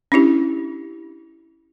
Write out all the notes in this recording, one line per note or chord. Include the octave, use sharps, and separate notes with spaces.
C#4 D4 E4 G4